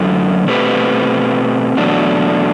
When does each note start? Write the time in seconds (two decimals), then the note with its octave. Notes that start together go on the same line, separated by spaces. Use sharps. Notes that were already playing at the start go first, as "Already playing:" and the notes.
Already playing: F#2 D3 F#3 A3
0.47 B2 A3 C4 G4 B4
1.77 E2 B2 F#3 A3 D4